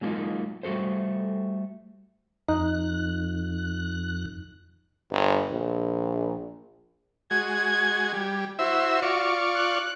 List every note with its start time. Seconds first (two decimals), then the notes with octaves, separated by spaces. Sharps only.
0.01 F#3 G#3 A#3 C#4 D#4 F4
0.63 G3 A3 F#4 A4 C5
2.49 F2 D#4 F#6
5.11 G1
5.50 A#1
7.31 G#3 F#4 G#6
8.14 G3
8.59 E4 F#4 C5 E5
9.02 F4 D5 C#6
9.55 F#6